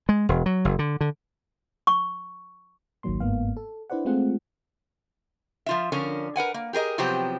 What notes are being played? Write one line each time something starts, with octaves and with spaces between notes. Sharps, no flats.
G#3
E1
F#3
F#1
D3
D3
C#6
G#1 C#2 D#3 F#3 A#3 C6
G1 G#2 A#3 B3 F5
A4
D4 E4 B4 C5 D5 F#5
G#3 A3 C4 F4 G#4 F#5
F3 F4 E5
D3 F3 C#4 A#4
A#4 B4 F#5 G#5
A#3
G4 G#4 A#4 D#5
C3 F3 F#3 B3 C4 G4